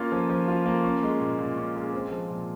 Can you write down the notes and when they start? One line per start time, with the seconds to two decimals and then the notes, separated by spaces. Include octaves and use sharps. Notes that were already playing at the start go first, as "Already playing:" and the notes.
Already playing: A#3 C#4 F4
0.12 F3
0.30 F3
0.48 F4
0.66 A#3
0.84 C#4
1.03 G#3
1.20 A#2
1.39 A#2
1.57 C#4
1.76 G#3
1.93 C4
2.12 F3
2.30 A#2